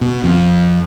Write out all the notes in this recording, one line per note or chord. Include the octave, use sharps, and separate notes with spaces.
B2
F2